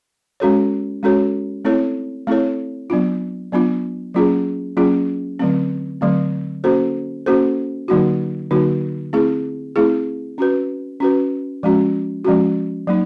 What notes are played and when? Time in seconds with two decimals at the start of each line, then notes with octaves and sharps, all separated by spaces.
0.40 G#3 C#4 F#4 A4 C#5
1.03 G#3 C#4 F#4 A4 C#5
1.65 A3 C4 E4 A4 C#5
2.27 A3 C4 E4 A4 C#5
2.90 F#3 B3 D4 F4
3.52 F#3 B3 D4 F4
4.14 F#3 A#3 C#4 F4 G#4
4.77 F#3 A#3 C#4 F4 G#4
5.39 D3 F#3 A3 C4
6.01 D3 F#3 A3 C4
6.64 A#3 C#4 F#4 A4 C5
7.26 A#3 C#4 F#4 A4 C5
7.88 D3 F#3 A#3 D#4 F#4
8.51 D3 F#3 A#3 D#4 F#4
9.13 A3 C4 E4 G#4
9.76 A3 C4 E4 G#4
10.38 C#4 F#4 B4
11.00 C#4 F#4 B4
11.63 F3 G#3 C#4 F#4
12.24 F3 G#3 C#4 F#4
12.87 F#3 A#3 D#4